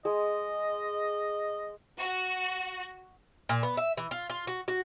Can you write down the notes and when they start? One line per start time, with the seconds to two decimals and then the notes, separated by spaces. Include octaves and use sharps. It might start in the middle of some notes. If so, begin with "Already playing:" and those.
0.05 G#3 D#5
1.98 F#4
3.49 A#2
3.63 B3
3.77 E5
3.97 E3
4.11 F4
4.30 F4
4.47 F#4
4.68 F#4